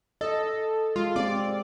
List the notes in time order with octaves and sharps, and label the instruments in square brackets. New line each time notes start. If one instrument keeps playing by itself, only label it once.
[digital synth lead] A4 [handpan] D#5
[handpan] G#3 [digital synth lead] F4
[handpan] C4 G4 [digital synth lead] D5